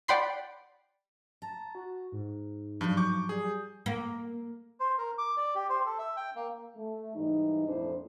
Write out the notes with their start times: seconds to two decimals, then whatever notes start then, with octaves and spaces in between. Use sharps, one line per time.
0.08 D5 F#5 G5 B5 C6 C7
1.42 A5 A#5
1.75 F#4
2.12 G#2
2.81 G2 F3 F#3
2.97 C#6 D6 G6
3.29 G3 G#4
3.86 A#3
4.80 C5
4.98 A#4
5.18 D6
5.37 D5
5.55 G4
5.69 C5
5.86 A4
5.99 E5
6.16 G5
6.36 A#3
6.76 A3
7.15 G#2 E3 G3 D#4
7.67 F2 A#2 A3 D4 E4 C5